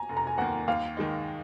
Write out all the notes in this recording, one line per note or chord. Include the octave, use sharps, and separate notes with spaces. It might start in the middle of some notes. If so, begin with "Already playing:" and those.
Already playing: G#5 A#5
F1
A#5
G#5
D#2 D#3 A#3 F#5
D#2 F5
D#3 G#3 D#4